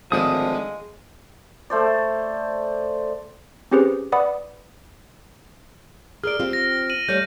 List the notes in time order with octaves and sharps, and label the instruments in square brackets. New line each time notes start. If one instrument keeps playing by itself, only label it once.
[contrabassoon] G#1 [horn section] A2 D3 F3 [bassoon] G#3 [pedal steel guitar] D#6
[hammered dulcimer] A3 C5 D5
[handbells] C4 C#4 G4 G#4 B4 C5
B4 D5 F#5 B5 D#6
[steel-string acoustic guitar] G#4 A#4 D5 [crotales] F6 D7
[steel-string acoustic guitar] C4 F4 G4
[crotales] A#6
D#7 F#7
[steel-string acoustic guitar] G3 A3 C#5 [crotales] G6